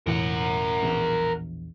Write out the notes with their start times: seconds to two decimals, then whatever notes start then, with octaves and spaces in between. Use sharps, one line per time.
0.07 E1 A1 E3 A#4 F#5
0.83 A#1 E2